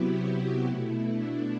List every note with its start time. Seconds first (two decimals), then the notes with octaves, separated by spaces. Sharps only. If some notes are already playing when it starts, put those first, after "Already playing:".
Already playing: C3 F#3 B3 E4 F#4 G4
0.24 F#4
0.65 B2 A3 E4
1.05 D4